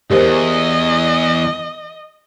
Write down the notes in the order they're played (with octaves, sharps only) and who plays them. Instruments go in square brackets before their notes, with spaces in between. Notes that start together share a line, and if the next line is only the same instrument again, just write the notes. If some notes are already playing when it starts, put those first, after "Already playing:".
[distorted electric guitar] E2 G#2 [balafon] G4 A#4 C5 [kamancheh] D#5